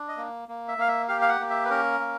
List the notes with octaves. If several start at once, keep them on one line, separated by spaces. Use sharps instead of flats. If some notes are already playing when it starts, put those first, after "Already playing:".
Already playing: D4
D#5
A#3
A#3
E5
A#3 F5
E5
G4 F5
F5
F#5
A#3
E5
B4
C#4 A#4
A#3